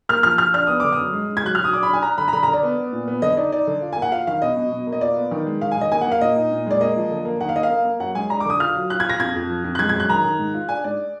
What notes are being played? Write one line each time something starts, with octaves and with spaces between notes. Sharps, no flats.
A#3 F6
F3 F6
F3 F6
D4 F6
B3 D#6
D3 D6
D#6
F#2
G#3
G#3
G#6
F#3 F#6
F#3 F6
D#6
D4 D6
B5
D4
G#5
D4 A#5
D3 B5
A#5
D3 B5
A#5
D3
D5
B3
B3
A#2
B3
D3 D#5
D#4 D5
D#4 D5
D3
F4
A#3 G#5
F#5
F4 F5
D#3 F5
B2 D#5
B2
B2
A#3
D#5
F4 D5
B3
D#3
G#3
D#3 F5
G#5
D#3 D#5
A#3 G#5
F#5
A#3 F5
A#2 D#5
D#4
A#2
G#3 D5
A#3 D#5
F3
D3
A#3
D#3 F#5
F5
A#3 D#5
F5
A#3
A#3
F#2 F#5
G#3 G#5
D4 A#5
D6
D3 D#6
F4 F6
F#3
F4 F#6
G#6
F4 A#6
F2 G#6
F2
F3
F2
F#6
G#3 G#6
G#6
F#2
F#6
D#3 A#5
D#3
G#2
F4
D4 G#5
G#2 D5